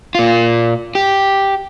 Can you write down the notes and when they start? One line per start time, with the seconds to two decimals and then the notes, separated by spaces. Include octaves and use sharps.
0.15 A#2 F4
0.95 G4